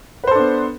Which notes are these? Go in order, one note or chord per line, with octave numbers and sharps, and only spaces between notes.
B3 D4 A4 B4 C5